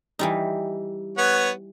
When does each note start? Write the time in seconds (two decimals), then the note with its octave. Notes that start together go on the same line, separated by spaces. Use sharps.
0.19 E3 G3 D#4
1.18 B3 C#5 F#5